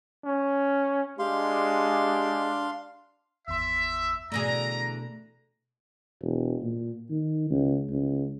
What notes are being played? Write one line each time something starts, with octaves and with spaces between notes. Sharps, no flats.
C#4
G#3 D4 G4 F5 C6
G#1 E2 E5 C6
B2 D3 E3 A3 G#4 A#5
E1
A#2
D#3
C#2
C#2